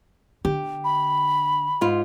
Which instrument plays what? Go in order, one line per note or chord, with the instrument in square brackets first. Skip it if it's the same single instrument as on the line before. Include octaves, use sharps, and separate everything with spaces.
[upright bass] D3 [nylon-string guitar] G4
[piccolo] B5
[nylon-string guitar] G#2 F4